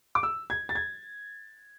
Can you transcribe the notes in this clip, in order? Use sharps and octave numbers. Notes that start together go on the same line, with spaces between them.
D6
E6
G#6
A6
G#6